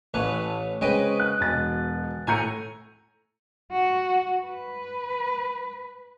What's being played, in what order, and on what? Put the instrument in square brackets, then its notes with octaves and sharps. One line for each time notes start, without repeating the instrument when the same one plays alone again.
[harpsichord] A1 C#4 B4 [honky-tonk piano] A3
[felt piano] C#3 G#3 C4 [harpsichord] B4 D#5 G5 [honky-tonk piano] C#5
[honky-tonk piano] F#6
[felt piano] E1 B2 A6
[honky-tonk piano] A2 A#5 C#7 [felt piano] A4 G6 D#7 [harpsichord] G#5
[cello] F#4
B4